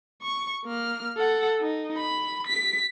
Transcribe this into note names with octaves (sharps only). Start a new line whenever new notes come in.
C#6
A#3 F6
A4 F#5
D#4
B5
B6